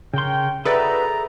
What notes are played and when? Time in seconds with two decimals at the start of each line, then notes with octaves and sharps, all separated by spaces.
0.14 C#3 A#4 C#5 G5 C6
0.65 D#4 F#4 G#4 A4 B4 D5 E5 A#5